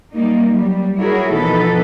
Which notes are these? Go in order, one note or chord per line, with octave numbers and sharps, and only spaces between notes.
G3 A#3 D#4
F#3 G3
E4 F#4 G#4 A#4 C#5
B2 E3 F3 D#4 A4 B4